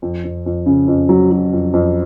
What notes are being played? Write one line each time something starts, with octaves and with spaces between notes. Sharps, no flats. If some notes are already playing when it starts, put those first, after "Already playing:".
F2
F2
F2
C#3
F2
F#3
F#3
F2
F2